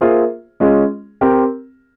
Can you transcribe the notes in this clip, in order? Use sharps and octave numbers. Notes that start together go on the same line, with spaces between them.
A#3 F4 G#4 C5 E5
G#3 C#4 F4 G#4
C4 G4 A#4